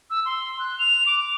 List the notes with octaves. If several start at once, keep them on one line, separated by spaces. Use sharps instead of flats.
E6
C6
F#6
F7
D6